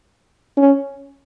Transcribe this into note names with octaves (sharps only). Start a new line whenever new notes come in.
C#4